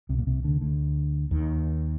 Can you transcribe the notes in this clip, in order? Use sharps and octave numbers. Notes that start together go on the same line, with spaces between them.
C2 C3
A#2
C2 C3
D2 D3
D2 D3
D#2 D#3